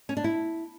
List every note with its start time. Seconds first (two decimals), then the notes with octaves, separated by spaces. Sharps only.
0.09 C#4
0.17 D4
0.24 E4